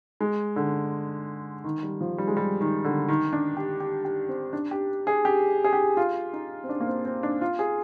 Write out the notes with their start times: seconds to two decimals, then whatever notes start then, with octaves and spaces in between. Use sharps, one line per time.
0.21 G#3
0.56 D3
1.64 D#3
1.83 G3
2.01 F3
2.18 G3
2.27 G#3
2.37 G3
2.61 D#3
2.84 D3
3.09 D#3
3.33 D4
3.57 G4
3.80 G4
4.05 G4
4.29 C4
4.53 D4
4.71 G4
5.07 G#4
5.25 G4
5.64 G#4
5.73 G4
5.97 F4
6.33 D#4
6.64 C4
6.69 D4
6.80 A#3
6.87 C4
7.05 C4
7.23 D4
7.41 F4
7.59 G#4